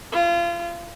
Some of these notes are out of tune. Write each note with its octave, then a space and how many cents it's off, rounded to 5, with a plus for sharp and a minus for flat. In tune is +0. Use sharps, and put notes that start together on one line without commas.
F4 -30